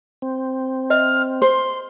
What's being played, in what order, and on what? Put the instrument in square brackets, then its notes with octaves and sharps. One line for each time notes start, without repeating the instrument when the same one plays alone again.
[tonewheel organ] C4
[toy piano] D#5 E5 [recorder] F6
[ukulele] C5 [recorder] C6